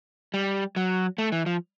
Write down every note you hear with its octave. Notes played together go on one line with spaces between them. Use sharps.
G3
F#3
A3
E3
F3